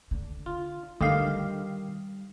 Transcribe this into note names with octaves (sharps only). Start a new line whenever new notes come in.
D3
F4
D3 D#3 G3 G4 D#5 F5